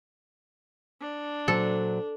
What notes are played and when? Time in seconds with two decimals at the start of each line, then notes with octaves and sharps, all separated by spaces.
1.01 D4
1.48 A#2 F#3 A4 C5